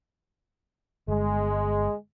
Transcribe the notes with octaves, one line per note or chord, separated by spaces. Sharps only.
G1 G#3